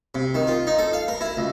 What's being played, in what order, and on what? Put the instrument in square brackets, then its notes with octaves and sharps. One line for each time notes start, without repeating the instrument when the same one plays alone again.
[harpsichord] C3
D#3
F4
D#4
A4
F5
A#4
E4
C#2